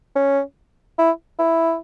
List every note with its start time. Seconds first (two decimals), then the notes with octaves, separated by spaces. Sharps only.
0.16 C#4
0.99 E4
1.39 E4